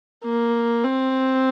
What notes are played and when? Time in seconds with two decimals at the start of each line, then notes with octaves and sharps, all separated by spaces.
0.25 A#3
0.84 C4